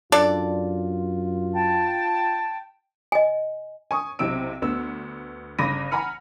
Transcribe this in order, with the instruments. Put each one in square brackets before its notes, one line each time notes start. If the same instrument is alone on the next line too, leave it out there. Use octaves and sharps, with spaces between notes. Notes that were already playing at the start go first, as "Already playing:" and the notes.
[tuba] F#2 [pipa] D4 A4 D5 [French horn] F4
[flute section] G5 A5
[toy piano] D#5 G#5
[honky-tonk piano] G#5 C#6 D#6
B1 C3 C4 E4 E6 D7
D2 B3 E6
G1 C#3 B5 D6 A#6 D#7
F#5 G#5 A#5 B5 F6 C#7